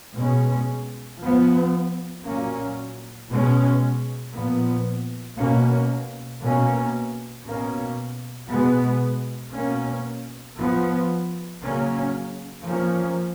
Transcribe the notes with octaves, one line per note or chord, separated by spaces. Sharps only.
B2 G#3 C#4
F3 B3
A#2 F#3 A#3 C#4
B2 G#3 C#4
A#2 F3 B3
B2 A#3 C#4
B2 A#3 C#4
B2 A#3 C#4
B2 G#3 B3
B2 A#3 C#4
F3 B3
C#3 F#3 A#3 C#4
F3 A#3 C#4